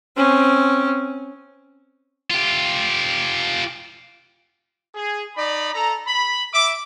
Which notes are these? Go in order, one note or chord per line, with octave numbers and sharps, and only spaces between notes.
C4 C#4
F4 G4
G#4
D#4 D5 B5
A4 A#5
B5
E5 D6